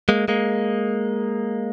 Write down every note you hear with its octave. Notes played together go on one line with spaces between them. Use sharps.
G#3 A#3
G#3 A#3